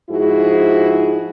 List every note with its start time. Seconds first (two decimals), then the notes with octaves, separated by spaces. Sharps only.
0.10 G#2 F3 E4 F#4 G#4